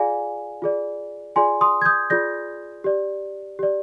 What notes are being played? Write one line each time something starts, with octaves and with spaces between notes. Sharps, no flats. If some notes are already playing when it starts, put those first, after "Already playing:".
Already playing: F4 G#4 D5 F5 G#5
F4 G#4 D5
F4 G#4 D5 G#5 C6
C6 D#6
G#6
D#6 G6
F4 G#4 D5 G6 A#6
G4 D5
G4 D5